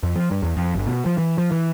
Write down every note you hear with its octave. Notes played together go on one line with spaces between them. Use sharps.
F2
F3
G2
E2
F2
G1
B2
F3
E3
F3
E3